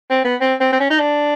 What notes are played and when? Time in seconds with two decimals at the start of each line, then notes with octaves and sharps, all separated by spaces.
0.10 C4
0.25 B3
0.41 C4
0.60 C4
0.72 C4
0.80 C#4
0.91 D#4
1.00 D4